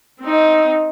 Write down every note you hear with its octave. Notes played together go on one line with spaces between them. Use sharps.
C4 D#4